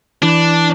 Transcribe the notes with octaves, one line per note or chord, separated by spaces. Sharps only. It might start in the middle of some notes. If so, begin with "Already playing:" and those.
E3 D4